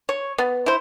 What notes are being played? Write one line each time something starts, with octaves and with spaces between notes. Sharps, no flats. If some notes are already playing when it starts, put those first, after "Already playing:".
C#5
B3
E4 C5